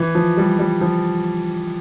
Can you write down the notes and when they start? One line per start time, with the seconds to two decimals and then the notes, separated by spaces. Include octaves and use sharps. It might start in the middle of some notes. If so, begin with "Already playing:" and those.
Already playing: E3
0.15 F3
0.37 G3
0.59 G3
0.81 F3